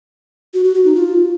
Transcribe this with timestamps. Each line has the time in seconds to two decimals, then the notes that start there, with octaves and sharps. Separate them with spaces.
0.54 F#4
0.64 F#4
0.75 F#4
0.85 D#4
0.95 F4